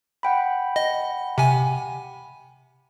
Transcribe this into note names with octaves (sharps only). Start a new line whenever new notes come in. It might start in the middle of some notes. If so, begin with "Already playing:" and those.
F#5 G5 B5
D#5
C3 G#5